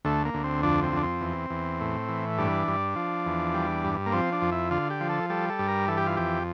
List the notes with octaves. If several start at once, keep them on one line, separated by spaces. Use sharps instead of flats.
D2 A3
A#3
D2
C4
F2 D4
C4
F2 D4
C4
E2
E2
A2
E3
G2 D4
G2
F3
E2
G3
G2
A#3
F3 C4
D4
F2
E4
D3 F4
G4
F3
A4
G3 A4
A4
G2
A#4
E3 A4
G4
F4
F2 G4